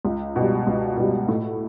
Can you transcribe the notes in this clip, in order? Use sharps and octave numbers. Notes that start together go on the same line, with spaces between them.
C#2
B2 G3
C#2
B2 G3
A2